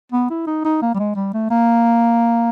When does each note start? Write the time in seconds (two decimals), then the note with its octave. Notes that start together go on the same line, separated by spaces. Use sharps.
0.12 B3
0.30 E4
0.47 D#4
0.65 D#4
0.82 A#3
0.95 G3
0.99 G#3
1.16 G3
1.34 A3
1.50 A#3